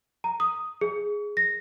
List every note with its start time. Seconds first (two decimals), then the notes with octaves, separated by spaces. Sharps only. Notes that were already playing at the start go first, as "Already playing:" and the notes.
0.24 A#5
0.40 D#6
0.81 G#4
1.37 A#6